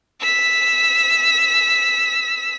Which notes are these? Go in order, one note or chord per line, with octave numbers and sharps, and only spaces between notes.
E6 B6